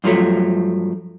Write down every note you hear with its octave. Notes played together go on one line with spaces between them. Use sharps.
G2 F3 F#3 A3